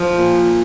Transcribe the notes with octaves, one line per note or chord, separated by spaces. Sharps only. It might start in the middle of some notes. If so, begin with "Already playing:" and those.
Already playing: F3
A#2